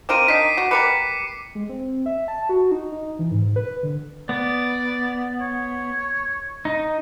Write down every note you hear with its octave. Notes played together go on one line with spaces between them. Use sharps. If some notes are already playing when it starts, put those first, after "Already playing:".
C4 F4 A#4 D6 D7 D#7
D#3 D4 D#4 B6 C7
F#4
G3 A#4 B4 D6 C#7
G#3
C4
E5
A5
F#4
D#4
D#4
E3
G#2
B4
D3
B3 D5
C#5
D#4